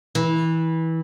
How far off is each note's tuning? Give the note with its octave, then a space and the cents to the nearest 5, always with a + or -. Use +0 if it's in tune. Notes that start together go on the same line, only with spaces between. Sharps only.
E3 -20